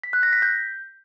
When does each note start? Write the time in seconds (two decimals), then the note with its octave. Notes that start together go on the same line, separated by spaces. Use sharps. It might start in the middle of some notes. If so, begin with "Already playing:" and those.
0.04 B6
0.13 F#6
0.23 A#6
0.33 B6
0.42 G6